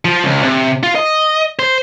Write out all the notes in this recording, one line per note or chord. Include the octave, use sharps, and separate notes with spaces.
F3
C#2
C3
F4
D#5
C5